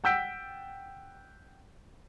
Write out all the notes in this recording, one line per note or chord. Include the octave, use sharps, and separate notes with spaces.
F#5 G5 E6 G6 B6 D7